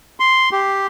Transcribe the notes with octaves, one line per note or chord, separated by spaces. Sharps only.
C6
G4